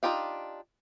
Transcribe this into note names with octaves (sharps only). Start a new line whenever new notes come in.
D4 D#4 F4 G4 F5